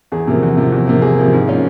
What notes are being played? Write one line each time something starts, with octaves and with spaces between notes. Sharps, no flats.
E2 G#4
C3 F3 A#3
E2
C3 F3 A#3
E2
C3 F3 A#3
E2 G#4
C3 F3 A#3
G#2
F3 A#3 C#4 F4